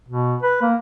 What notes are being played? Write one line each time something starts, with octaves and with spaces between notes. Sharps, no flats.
B2
B4
A#3